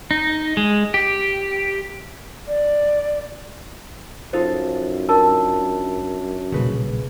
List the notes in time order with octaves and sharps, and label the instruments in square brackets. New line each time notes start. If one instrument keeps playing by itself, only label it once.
[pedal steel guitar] D#4
G#3
G4
[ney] D5
[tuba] F#2 [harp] D#4 F4 A4 [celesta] C5
[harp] D4 [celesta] A#4 A5 E6
[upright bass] D#1 B1 [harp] C#3 B4